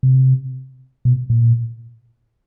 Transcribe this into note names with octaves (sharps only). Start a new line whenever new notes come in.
C3
B2
A#2